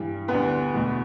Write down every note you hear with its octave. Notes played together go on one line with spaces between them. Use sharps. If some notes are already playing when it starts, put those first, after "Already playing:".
Already playing: G2 E3 G3
D2 D3 G3 B3 B4
E2 B2 A3